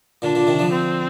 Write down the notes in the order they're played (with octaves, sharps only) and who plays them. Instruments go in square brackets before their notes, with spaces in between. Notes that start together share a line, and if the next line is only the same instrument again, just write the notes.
[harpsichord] A#2 D3 [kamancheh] D4
[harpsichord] A#2 D3
C3 D#3
D3 F3
[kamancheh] C4